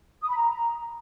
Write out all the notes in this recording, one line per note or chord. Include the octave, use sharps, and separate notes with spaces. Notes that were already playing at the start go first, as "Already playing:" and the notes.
D#6
B5
A#5